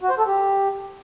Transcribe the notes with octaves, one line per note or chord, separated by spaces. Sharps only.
F#4
C5
A4
G4